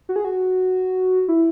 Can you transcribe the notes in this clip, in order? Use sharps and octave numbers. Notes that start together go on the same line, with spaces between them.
F#4
G#4
F#4
E4